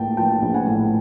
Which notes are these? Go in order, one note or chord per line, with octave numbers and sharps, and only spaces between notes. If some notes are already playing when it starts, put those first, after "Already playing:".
Already playing: A#1 A2 A#3 G5 A5
F3 G5 A5
A#1
F#5 G#5
A2